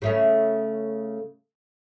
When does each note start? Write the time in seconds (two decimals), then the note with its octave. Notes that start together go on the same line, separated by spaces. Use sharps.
0.02 C#3 A3 C#4